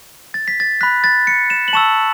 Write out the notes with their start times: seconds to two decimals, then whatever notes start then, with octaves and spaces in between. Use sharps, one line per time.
0.34 A6
0.48 B6
0.60 A6
0.81 B5 F#6 B6
1.04 A6
1.27 C#7
1.50 E7
1.68 F#7
1.73 A5 C#6 E6 E7